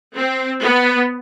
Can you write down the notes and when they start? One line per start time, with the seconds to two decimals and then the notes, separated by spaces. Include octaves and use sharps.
0.16 C4
0.63 B3